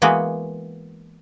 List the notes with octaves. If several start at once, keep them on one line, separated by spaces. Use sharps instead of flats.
E3 G#3 A#3 B3 F#4